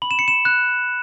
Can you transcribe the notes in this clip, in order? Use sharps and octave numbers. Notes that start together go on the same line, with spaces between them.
B5 F#7
E7
C#7
E7
F#6